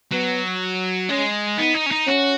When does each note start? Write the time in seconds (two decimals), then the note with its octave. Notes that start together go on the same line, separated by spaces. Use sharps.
0.12 F#3 B3
1.09 G#3 C#4
1.59 B3 D#4
1.74 D#4
1.86 C#4
1.91 D#4
2.07 C#4 F#4